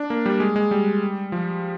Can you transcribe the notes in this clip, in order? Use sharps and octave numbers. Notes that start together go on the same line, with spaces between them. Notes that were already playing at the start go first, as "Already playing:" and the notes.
Already playing: D4
A#3
G3
G#3
G#3
G3
F3